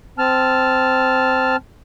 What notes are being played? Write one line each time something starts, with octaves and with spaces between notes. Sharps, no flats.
C4 A5 F6